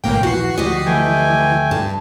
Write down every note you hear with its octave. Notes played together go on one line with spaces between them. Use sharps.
A1 G#2 B2 D3 A#3 A#4 G5
A#1 D#2 E3 F#4 C7
D2 D3 F3 G4 D#5
E3 A3 G5 G#5
G2 A5